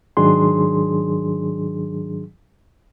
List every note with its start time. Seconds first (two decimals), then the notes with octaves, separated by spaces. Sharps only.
0.17 G#2 D#3 F#3 D4 G#4 C6